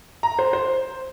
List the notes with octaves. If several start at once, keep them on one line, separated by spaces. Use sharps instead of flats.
A#5
C5
C5